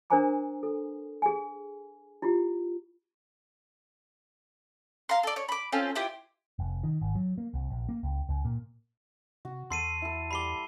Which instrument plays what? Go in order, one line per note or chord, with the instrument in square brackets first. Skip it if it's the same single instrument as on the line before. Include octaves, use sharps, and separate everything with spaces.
[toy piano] D4 A#4 C5 G#5 A#5 D6
A4
G#4 G#5
E4 F4 G4
[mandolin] F5 A#5 C6
A4 D5
C#5
B5 D6
C4 C#4 F4 A4
E4 F4 G4 C5
[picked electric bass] F1
D#3
G#1
F#3
A#3
C2
A#1
A#3
C#2
C#2
A#2
[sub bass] C3 [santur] F#4
[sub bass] E2 [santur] F#4 A4 B5 [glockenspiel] C6 C7 D#7
[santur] E4 A4
[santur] G3 D6 [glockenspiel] B5 C7 G7